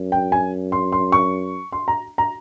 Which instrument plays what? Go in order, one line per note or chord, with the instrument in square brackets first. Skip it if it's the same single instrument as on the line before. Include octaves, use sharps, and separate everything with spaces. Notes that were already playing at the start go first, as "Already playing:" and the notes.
Already playing: [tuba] F#2
[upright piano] G5
G#5
C6
C6
C#6
C6
A#5
A#5